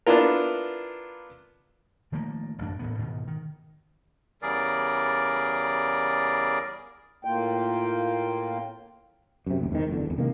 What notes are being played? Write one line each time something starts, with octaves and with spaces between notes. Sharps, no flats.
B3 D4 E4 F4 A#4
D#3 F3 A3 A#3
A1 F#2 D4
A1 A2 B3
G#2 B2 D#3
D#3
E2 C#3 G3 G#4 A#4 D5
A2 A#3 F4 G5
F#2 C3
F#1 D2
E2 G#2 C3 D#3
F#1 E2 D3
G#1 E2
C3 D#3 A#3